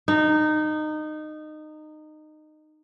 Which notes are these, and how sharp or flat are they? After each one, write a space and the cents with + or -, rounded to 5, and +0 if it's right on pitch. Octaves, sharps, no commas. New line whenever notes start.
D#4 -20